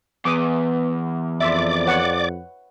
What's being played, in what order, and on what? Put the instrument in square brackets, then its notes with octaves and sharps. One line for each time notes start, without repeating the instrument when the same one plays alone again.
[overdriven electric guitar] E2 [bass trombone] B3 [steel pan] D6 D#6
[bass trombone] F2 [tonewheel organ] D5 D6 [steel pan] E5 C6
[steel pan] B4 C#5 F#5